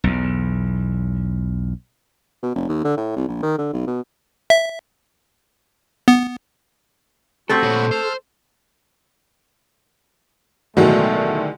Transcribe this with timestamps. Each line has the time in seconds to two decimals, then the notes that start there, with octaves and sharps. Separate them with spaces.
0.04 B1 E2
2.43 B2
2.55 F1
2.69 D#2
2.84 D3
2.97 A2
3.16 C2
3.28 A#1
3.42 D#3
3.58 D3
3.73 B1
3.87 B2
4.50 E5
6.08 B3
7.50 A3 C4 F#4 G4 A4 B5 C#6
7.64 A#2 C#5
7.91 C5 A5 E6 F6
10.77 A1 B2 D3 D#3 F#3 G#3 A3 F#4